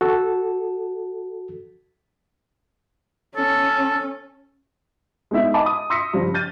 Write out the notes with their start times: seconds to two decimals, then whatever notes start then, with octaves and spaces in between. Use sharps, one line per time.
0.01 F#4 A4
3.36 C#4 A4
5.31 G#3 B3 D#4 E4 E5
5.54 D#5 G#5 A5 B5 D6
5.66 D#6
5.90 C6 D#6 E6 A#6 B6 C#7
6.13 G2 C#3 F3 G3
6.34 F6 G6 A6 D#7